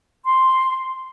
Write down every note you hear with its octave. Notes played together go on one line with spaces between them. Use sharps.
C6